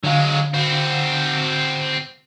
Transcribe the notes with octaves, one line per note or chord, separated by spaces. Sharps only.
D3 F#3 G#3 F5
C4 F#4